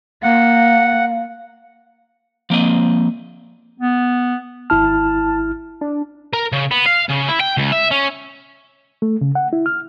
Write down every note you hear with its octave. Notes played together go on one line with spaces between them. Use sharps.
A#3 F5 F#5
F3 A#3 C4 D#5
B3
G#1 E4 A5 F6
D4
A#4
C#3
B3
F5
C#3
E4
G5
C#2
E5
C#4
A3
C#3
F#5
E4
F6